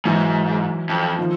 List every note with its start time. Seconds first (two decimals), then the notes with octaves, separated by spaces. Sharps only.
0.05 G#2 E3 F#3
0.89 F2
1.19 D#3 F3